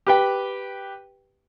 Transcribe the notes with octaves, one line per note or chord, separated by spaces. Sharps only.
G4 B4 G5